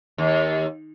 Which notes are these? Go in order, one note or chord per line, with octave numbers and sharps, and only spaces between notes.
D#2